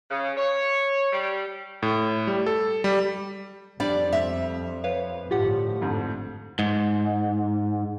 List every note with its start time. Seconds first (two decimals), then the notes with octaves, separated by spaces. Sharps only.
0.10 C#3
0.37 C#5
1.13 G3
1.82 A2
2.27 G3
2.46 A4
2.84 G3
3.80 F2 G3 D4 D5
4.13 E5 F7
4.84 B4 C#5 F5
5.31 G1 A2 F3 F4 G4 F#5
5.81 F2 G#2 D3
6.59 G#2